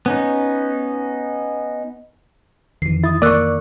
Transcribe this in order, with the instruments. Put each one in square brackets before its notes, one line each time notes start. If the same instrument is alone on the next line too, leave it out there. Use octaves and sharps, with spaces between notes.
[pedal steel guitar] B3 C#4 D#4
[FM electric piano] F2 E3 [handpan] D#3 [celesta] C7
[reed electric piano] E4 [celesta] D#6 A6
[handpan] A#3 [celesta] A#4 E6 F#6 [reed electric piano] D5 C#6